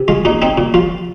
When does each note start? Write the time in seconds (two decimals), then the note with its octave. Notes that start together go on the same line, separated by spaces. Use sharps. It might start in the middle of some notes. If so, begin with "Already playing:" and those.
Already playing: C3
0.08 G#3 F4
0.25 A#2 D#4
0.42 C4 D#4
0.58 A#2
0.74 F3 F4